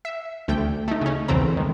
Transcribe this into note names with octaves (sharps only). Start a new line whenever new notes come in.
E5
D2 A3 G5
A3 D#4
C#3 C#4
B1 E2 C#3 A3 C4 A#5
D#3 G#3